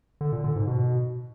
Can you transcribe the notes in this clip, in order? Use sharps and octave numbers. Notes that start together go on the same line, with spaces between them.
D3
A#2
D3
G#2
B2